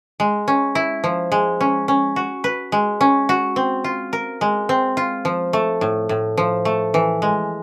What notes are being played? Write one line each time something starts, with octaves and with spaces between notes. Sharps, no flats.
G#3
C#4
E4
F3
G#3
C#4
C#4
F#4
B4
G#3
C#4
F#4
C4
F4
A#4
G#3
C4
F4
F3
A3
A2
A2
F3
A3
E3
G#3